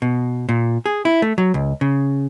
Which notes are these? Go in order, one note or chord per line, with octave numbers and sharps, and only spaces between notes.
B2
A#2
G#4
E4
A3
F#3
C#2
C#3